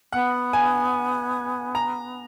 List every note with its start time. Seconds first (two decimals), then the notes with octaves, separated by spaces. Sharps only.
0.13 B3 F#5
0.53 G#5
1.75 A#5